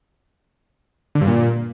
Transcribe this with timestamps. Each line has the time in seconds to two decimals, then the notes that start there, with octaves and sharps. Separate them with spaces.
1.15 D3
1.21 G2
1.27 A#2